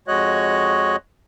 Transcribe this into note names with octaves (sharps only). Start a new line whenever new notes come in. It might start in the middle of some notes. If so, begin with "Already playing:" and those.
F2 G#3 F#4 C#5 D#5 F#6